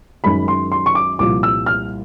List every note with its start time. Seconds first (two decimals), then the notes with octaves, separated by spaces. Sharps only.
0.24 F#2 D#3 G#3 B5
0.48 C6
0.72 C6
0.86 C#6
0.95 D6
1.19 C2 A#2 F3 D6
1.43 E6
1.66 F6